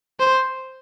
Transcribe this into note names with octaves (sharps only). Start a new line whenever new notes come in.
C5